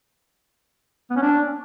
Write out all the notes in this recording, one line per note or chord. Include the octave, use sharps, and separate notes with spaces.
B3
C#4
D4